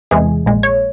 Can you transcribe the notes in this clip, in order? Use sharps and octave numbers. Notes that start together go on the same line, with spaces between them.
E2 C3 E3 G#3 G#4
A#1 A#2 G#3
C#5